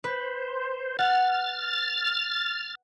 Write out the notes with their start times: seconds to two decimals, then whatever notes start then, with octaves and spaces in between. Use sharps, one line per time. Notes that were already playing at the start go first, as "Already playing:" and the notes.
0.04 B4 C5
0.99 F#5 F6 A6